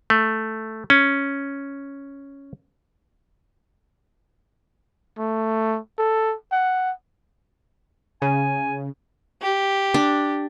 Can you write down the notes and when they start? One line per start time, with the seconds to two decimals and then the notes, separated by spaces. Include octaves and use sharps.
0.10 A3
0.90 C#4
5.18 A3
5.99 A4
6.52 F#5
8.22 C#3 G#5
9.42 G4
9.94 D4